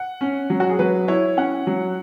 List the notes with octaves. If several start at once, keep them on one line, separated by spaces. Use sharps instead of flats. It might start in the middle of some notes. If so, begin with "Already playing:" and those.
Already playing: F#5
C#4
F#3
F#4
G#4
F#3 B4
E4 C#5
C#4 F#5
F#3